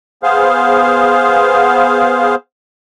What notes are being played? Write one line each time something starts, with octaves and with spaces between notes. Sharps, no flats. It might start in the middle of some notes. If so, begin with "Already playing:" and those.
B3 G#4 C5 F5